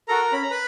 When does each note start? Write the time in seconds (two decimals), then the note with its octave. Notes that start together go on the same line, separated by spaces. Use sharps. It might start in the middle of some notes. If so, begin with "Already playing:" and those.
0.08 F#4 A4 A#4 A#5
0.32 C#4 B5
0.42 A#5
0.51 B4 B5